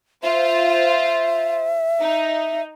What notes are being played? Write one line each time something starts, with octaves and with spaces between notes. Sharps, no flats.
F4 C5 E5
D#4